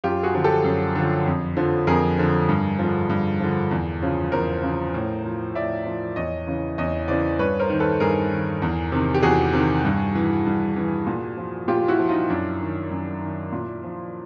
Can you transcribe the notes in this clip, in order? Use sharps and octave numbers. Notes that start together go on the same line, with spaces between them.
F#2 F4 G4
F#4 G#4
D3 F3
G4 A4
F#2
D3 F3
F2
D3 F3
F2 G#4 A#4
D3 F3
G2
D3 F3
G2
D3 F3
E2
C#3 F3
E2 A#4 C5
C#3 F3
A2
F3
A2 D5 E5
F3
E2 C#5 D#5
C#3 E3
E2 C#5 D#5
C#3 E3 C5 D5
G2 B4 C#5
A#4 C5
D#3
A4 B4
G2 G#4 A#4
D#3
E2
C3 D#3
G4
E2 F#4 G#4
C3 D#3
G2
E3
G2
E3
A#2
F3
A#2 F4 G4
E4 F#4
F3
D#4 F4
F#2 D4 E4
D#3
F#2
D#3
A#2
F3